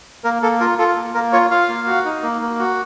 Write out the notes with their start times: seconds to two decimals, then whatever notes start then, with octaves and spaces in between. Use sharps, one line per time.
0.24 A#3 A#4
0.42 A#3 A4
0.60 F4 A#4
0.78 F4 A4
0.96 A#3
1.14 A#3 A#4
1.32 F4 C#5
1.50 F4 F5
1.69 A#3
1.87 F#4
2.05 D#4
2.23 A#3
2.41 A#3
2.59 F#4